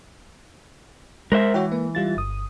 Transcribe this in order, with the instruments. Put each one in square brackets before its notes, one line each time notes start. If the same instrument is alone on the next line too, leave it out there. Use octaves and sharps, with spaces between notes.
[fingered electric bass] G#3 [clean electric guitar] A#4 C5 E5
[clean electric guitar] E3 [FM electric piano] F#4 C#5 G5
[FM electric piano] A#3 B4
G3 F4 A6
G1 D#6